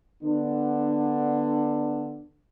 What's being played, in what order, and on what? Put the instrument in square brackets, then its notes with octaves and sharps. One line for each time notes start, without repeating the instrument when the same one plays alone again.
[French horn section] D3 B3 D4